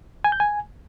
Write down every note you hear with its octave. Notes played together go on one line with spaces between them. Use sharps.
G#5
G6
G#5